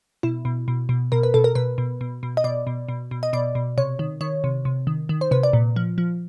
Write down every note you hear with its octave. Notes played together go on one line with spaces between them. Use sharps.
B2 E4
B2
B2
B2
B2 A#4
B4
B2 A4
A#4
B2 B4
B2
B2
B2
D#5
B2 D5
B2
B2
B2
D#5
B2 D5
B2
C3 C#5
D#3
D#3 C#5
C3
C3
D#3
D#3
C5
C3 B4
D5
A#2
F3
F3